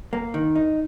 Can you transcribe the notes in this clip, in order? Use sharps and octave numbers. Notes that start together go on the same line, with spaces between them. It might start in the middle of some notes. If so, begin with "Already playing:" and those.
A#3
D#3
D#4